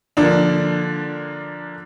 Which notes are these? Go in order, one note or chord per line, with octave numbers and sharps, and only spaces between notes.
D3 F3 A#3 D4